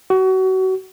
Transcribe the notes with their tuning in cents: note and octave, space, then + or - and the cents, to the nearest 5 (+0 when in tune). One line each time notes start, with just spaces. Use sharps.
F#4 +30